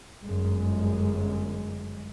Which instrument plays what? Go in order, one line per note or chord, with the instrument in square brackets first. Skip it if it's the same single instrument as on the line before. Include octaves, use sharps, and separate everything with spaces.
[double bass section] G1 F#2 G#3